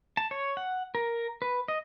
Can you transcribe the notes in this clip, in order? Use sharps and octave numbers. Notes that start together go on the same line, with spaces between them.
A5
C#5
F#5
A#4
B4
D#5